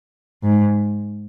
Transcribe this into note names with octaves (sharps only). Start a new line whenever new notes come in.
G#2